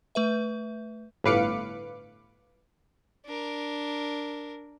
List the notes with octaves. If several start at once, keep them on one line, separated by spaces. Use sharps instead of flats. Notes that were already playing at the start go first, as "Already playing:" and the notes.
A3 B4 E5
G1 A2 B4 F5 D6 C#7
D4 A#4